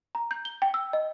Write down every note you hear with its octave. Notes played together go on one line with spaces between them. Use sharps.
A#5
G6
G7
G5
E6
D#5